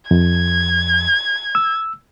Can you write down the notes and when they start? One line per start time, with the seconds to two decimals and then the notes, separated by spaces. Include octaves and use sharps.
0.11 F2 G#6
1.55 E6